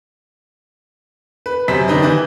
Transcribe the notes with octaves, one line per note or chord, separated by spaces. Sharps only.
B4
F#2 C3 C5 B6
D#3 D4 D#4 B4 D#5
E3 E4 B4 G6